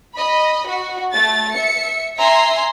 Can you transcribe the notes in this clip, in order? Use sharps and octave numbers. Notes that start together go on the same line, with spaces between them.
D#5 B5
F#4
A3 A6
E5 C#7
E5 G#5 A#5 C6